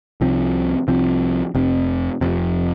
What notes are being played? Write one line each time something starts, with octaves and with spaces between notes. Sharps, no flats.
C2 C3 F3 C4
C2 C3 F3 C4
F1 F2 C3
F1 F2 C3